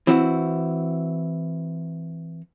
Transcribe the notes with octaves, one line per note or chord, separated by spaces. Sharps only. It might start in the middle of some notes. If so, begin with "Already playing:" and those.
E3 C4 E4 F#4